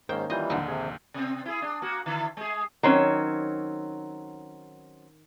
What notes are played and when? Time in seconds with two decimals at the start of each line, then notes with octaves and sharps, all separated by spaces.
0.09 G#2 D#3 A#3 C#4 C5 G5
0.30 E3 G3 F4 D#5 G6
0.50 A#1 D#2 D3 D#4
0.68 C3 G#4
1.14 C3 C4
1.46 E4 G#4
1.62 D4
1.82 A#3 F#4
2.06 D3 E4
2.37 G#3 G#4
2.83 D#3 F#3 C4 C#4